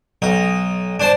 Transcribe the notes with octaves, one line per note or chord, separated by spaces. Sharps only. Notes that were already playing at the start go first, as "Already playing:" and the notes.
B1 D#4
D4 C5 A5